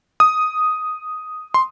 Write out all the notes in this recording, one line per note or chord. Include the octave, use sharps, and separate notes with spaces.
D#6
C6